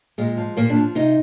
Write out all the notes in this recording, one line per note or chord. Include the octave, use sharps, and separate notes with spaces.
A#2 G#3
F3
A#2 A#3
D4
F3
C3 D#4